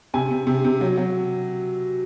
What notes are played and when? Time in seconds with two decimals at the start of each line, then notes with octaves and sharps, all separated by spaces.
0.14 C3 G#5
0.31 C3
0.47 C3
0.65 C3
0.81 F#3
0.97 F#3